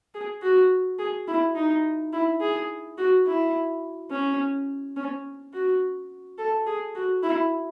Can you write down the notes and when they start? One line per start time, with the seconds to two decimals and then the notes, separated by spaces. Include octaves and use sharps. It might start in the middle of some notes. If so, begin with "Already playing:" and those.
0.15 G#4
0.42 F#4
0.99 G#4
1.28 E4
1.55 D#4
2.13 E4
2.41 G#4
2.98 F#4
3.26 E4
4.11 C#4
4.96 C#4
5.53 F#4
6.38 A4
6.67 G#4
6.95 F#4
7.23 E4